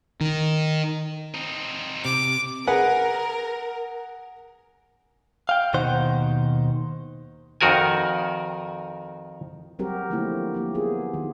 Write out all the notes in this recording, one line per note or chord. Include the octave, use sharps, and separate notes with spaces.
D#3
C4 D#4
C3 D6
G#4 A#4 B4 F#5
F5 G5
D#2 B2 D#3 D#4 C5 F#5
F2 D#3 F#4 A#4 G#5
F#3 G3 C4 F#4 G4 A#4
D3 F3 A3 A#3 E4 G4
A#3 G4
B3 F4 G#4
D#3